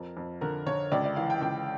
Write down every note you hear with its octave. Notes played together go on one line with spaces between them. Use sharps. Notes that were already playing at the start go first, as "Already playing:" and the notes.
Already playing: F2 A#4
F2
D3 A#4
D3 C#5
C#2 D5
D5
E3 F5
G5
C#2 G5